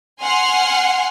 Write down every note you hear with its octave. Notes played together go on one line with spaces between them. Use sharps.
F#5 G#5 C6 F6 C7